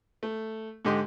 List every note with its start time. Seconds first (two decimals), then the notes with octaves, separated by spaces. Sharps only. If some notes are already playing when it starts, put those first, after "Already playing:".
0.23 A3
0.85 G#2 D3 G4 D#5 C6